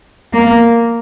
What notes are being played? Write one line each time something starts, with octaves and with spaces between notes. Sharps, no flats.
A#3